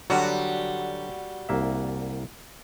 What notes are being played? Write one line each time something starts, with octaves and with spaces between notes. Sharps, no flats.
D3 F#3 G3 F#4
C2 A#3 E5